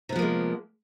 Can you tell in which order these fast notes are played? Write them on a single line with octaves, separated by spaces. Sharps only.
C3 B3 F3 A#3 G#3